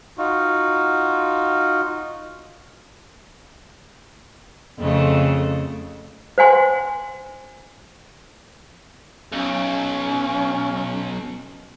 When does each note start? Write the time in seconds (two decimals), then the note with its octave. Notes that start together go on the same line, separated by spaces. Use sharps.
0.18 D#4 F4 F#4
4.79 F2 C#3 A3
6.38 C5 F#5 G#5 C6
9.33 B1 C#4